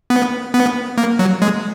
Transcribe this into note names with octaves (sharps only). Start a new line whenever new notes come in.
B3
B3
A#3
F#3
G#3